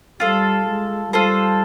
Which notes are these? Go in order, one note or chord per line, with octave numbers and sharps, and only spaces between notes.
G3 F4 A4 C5
G#3
G3 F4 A4 C5